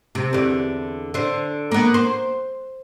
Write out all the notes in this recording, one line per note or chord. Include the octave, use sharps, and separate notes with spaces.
C3
E2 D3
D3 C5
A#3 B3
C5